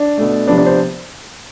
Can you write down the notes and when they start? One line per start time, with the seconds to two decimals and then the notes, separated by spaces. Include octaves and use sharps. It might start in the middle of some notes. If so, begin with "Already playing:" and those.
Already playing: D4
0.18 B2 A3
0.47 C3 F3 B3 D4
0.58 D4
0.66 C5